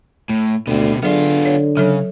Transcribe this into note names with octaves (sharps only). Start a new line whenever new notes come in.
A2
D2 B2 C4
D3 F#3 B3 F4 G#4 D5
C#5
C#3 F#3 A4 C#5